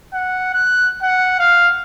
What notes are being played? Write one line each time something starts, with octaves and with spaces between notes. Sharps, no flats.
F#5
F#6
F#5
F5